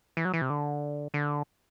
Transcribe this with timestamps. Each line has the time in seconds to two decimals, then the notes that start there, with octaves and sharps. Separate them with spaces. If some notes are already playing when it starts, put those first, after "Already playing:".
0.17 E3
0.25 F#3
0.34 E3
0.42 C3
0.50 D3
1.14 D3